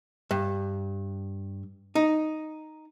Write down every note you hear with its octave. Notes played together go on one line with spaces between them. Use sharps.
G2
D#4